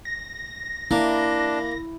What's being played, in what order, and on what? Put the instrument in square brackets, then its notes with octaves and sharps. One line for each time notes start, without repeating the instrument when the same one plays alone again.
[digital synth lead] A#6
[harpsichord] A#3 [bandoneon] D4 [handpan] E4